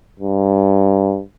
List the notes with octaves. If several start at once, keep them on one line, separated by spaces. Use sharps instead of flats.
G2